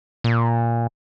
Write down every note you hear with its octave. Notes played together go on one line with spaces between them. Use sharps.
A#2